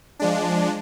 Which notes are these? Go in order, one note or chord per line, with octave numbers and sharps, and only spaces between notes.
F3 G#3 D4